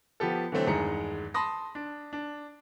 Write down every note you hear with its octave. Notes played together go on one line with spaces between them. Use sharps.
F3 B3 G4 A4
D3 E3 F#3 A3 C4
E2 G2 D#3 G#3 A#5 C#7
A5 B5 C6 D#6 A#6
D4
D4